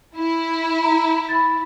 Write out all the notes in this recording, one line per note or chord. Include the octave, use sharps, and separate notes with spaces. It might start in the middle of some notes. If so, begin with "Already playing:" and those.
E4
A#5
B5 A6